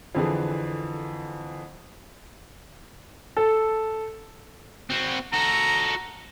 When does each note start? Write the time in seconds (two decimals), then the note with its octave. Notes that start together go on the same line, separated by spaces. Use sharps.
0.15 F2 D3 E3 G#4
3.37 A4
4.90 C4 F#4
5.33 F#4 A4 A#5